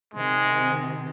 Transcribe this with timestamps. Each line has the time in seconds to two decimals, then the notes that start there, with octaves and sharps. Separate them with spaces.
0.14 C3 D#3 G#3